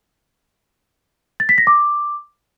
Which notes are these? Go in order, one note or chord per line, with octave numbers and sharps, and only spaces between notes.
A6
B6
A#6
D6